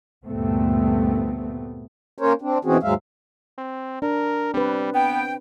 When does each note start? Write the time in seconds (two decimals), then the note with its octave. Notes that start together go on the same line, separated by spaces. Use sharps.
0.25 D2 G2 A#2 A3 B3 C4
2.18 A#3 C#4 A#4 C5 C#5
2.42 C4 D4
2.65 B2 E3 C4 C#4 F#4 G#4
2.83 D#2 G#2 F#3 G#3 E5 F5
3.58 C4
4.02 D4 A#4
4.54 G3 C4 D4 B4
4.94 B3 G5